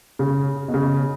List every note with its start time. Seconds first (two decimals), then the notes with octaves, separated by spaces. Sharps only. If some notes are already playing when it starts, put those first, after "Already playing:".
0.19 C#3
0.68 B2
0.74 C#3